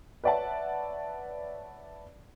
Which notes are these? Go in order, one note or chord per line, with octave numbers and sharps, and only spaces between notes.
B4 C#5 D5 E5 F#5 A5